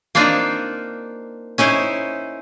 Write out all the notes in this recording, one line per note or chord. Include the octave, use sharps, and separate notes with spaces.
A#3 C4 D4 D#4 F4
C#4 D#4 E4 C5